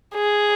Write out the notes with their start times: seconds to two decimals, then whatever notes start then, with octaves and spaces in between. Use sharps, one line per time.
0.15 G#4